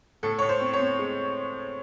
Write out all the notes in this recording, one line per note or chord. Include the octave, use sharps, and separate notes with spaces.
A2 A4
A2 C#5
C5
C4
C#5
C4
G#3